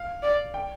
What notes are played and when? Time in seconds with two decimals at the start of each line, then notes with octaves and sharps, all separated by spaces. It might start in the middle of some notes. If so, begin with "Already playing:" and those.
Already playing: F5
0.23 D5
0.54 G5